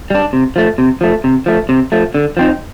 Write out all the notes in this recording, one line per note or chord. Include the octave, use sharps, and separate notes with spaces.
G3 D4
C3
F3 A3
C3
F3 A3
C3
F3 A3
C3
F3 A3
D3
F3 C4 D#4